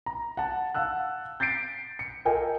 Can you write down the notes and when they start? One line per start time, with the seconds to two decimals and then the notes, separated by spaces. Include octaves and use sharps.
0.06 A#5
0.37 F#5 A5
0.74 F5 F#5 A5 E6 F#6
1.40 G6 A6 B6 C7 D7
1.99 C#7
2.25 F4 A4 A#4 D#5 G5 G#5